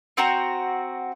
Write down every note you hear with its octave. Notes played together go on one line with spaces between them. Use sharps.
C4 F#4 G5 A#5